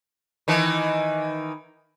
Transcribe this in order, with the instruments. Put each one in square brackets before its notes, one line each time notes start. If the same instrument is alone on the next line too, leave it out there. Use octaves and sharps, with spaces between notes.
[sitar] D#3 E3